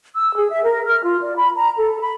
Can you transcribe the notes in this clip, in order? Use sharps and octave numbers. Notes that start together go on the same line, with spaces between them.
E6
G#4
E5
A#4
F6
F4
D5
B5
A#5
A4
B5